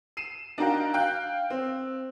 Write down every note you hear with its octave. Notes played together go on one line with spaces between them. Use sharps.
C7 D#7 E7
D4 D#4 F#4 A#4 F5 G5
F5 G5 F#6
C4